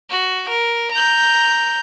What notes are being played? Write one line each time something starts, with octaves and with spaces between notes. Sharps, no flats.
F#4
A#4
A#5 G6